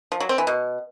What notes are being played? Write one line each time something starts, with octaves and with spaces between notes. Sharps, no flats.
F3
F#3
C4
E3
B2